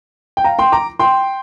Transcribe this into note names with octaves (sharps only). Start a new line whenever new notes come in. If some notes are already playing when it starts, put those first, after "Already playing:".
G5
F5 A#5
G5 C6
A#5 D6
G5 C6